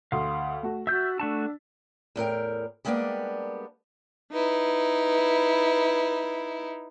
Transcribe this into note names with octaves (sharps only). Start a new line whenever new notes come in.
D2 F5 C6 D#6
A3 F#4
F#4 E5 E6 G6 A6 B6
A3 D4 F#4 A5
E2 A2 A#4 G5
G3 G#3 A#3 B3 D4 G4
D#4 E4 B4